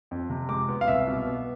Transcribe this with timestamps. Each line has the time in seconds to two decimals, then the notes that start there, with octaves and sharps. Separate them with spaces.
0.11 F2
0.30 C3
0.49 G#3 D6
0.69 B3
0.81 F5
0.88 C2 E5
1.07 B2
1.27 B3